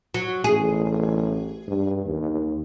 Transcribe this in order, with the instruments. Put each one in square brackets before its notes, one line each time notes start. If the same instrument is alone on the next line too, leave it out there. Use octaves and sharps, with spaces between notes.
[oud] F#3
[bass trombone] A1 [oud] G#4
[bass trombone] G2
D#2